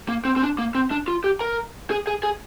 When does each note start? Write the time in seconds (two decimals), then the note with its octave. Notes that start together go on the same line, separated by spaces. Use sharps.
0.09 A#3
0.25 C4
0.36 C4
0.42 D4
0.59 A#3
0.75 C4
0.91 D4
1.08 F4
1.24 G4
1.41 A#4
1.91 G#4
2.07 G#4
2.23 G#4